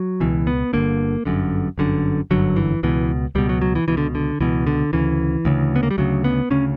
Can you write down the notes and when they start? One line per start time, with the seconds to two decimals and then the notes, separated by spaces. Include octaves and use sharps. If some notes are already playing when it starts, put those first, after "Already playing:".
Already playing: F#3
0.20 C#2 B2 E3
0.47 B3
0.73 G1 F#2 D3 A#3
1.25 G1 F#2 D3
1.78 G1 F#2 D3
2.31 G1 F#2 D3 F#3
2.56 E3
2.83 C#2 B2 E3
3.35 C#2 B2 G3
3.49 F#3
3.62 F#3
3.75 E3
3.88 C#2 B2 E3
3.97 D3
4.15 D3
4.40 C#2 B2 E3
4.67 D3
4.93 D2 C#3 E3
5.45 D2 C#3
5.76 B3
5.83 A#3
5.91 G3
5.98 D2 C#3 F#3
6.24 B3
6.50 D2 C#3 C#4